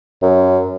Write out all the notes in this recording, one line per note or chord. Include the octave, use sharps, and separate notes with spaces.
F#2